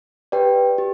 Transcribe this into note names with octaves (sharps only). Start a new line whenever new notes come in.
G4 B4 D5 G5
G4